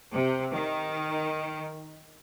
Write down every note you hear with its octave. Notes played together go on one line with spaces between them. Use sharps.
C3
D#3